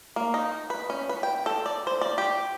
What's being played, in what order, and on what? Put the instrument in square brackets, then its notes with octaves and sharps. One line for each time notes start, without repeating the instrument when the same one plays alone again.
[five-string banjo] A#3
D#4
B4
C#4
B4
G5
A4
D5
C5
D5
G4